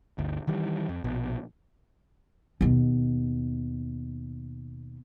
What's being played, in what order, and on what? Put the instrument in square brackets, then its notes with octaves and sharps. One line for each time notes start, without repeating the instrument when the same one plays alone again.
[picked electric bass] G1 D2
D#3 E3 G3
F2
A#1 B2
[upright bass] D#2 B2